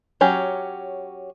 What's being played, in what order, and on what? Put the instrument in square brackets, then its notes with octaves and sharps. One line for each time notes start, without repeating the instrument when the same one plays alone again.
[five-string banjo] F#3 C#4 G4